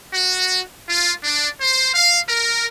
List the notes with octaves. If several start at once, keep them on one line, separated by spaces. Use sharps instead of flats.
F#4
F4
D4
C5
F5
A#4